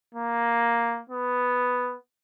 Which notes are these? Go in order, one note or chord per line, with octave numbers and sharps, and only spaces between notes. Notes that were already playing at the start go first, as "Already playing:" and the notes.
A#3
B3